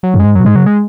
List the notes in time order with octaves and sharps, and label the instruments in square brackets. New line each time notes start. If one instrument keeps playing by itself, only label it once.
[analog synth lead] F#3
[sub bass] F#2
[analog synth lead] G#3
[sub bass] G#2
[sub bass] F#2 [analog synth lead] F#3
[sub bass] B2
[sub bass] G#2 [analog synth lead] G#3
[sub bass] C#3 [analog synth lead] F#3
[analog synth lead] G#3